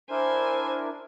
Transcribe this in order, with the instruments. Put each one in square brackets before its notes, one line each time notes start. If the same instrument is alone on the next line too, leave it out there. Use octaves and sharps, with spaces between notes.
[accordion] D4 E4 A#4 [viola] C5 G#5